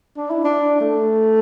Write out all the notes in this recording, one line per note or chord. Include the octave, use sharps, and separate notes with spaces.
D4
E4
D4
A3